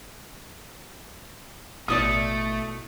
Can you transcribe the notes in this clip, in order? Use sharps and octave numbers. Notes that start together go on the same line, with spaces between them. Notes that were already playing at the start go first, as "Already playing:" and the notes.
A1 B2 A3 E4 D5 D#6